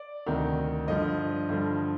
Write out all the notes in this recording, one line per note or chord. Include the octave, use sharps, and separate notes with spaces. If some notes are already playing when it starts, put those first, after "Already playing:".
Already playing: D5
D2 C3 D#3
G2 D3 F3 D#5
G2 D3 F3